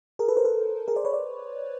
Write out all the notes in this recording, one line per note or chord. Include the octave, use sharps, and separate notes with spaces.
G#4 A#4
A4 B4
A#4 C5
A4 B4
G#4 A#4
C5 D5
B4 C#5
C5 D5